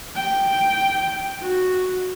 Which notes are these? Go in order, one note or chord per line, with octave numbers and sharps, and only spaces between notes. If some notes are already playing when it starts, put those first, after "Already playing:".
G5
F#4